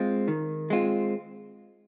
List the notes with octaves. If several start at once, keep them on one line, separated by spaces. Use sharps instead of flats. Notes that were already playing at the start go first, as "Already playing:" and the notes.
Already playing: G#3 C4 F4
D#3
G#3 C4 F4